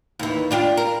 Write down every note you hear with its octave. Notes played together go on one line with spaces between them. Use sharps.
D#2 E3
D4 F4 G4
A#4